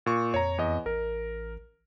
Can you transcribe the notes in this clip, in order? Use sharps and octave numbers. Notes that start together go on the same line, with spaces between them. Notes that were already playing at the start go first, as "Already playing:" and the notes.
A#2 C#6
F2 C#5 A#5
E2 D#5
A1 A#4